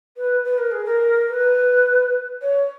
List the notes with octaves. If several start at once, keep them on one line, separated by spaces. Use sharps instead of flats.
B4
B4
A#4
G#4
A#4
B4
C#5